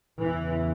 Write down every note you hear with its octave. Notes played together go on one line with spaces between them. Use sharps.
E2 C#3 E3